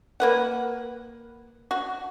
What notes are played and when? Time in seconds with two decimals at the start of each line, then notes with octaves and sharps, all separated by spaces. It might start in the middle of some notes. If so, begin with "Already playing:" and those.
0.20 A#3 B4 F#5
1.71 F#4